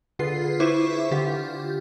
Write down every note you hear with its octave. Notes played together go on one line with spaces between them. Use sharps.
D3 F4 G#4 B4 C7
E4 B4 C5 E5 C#6 D6
D3 F4 G4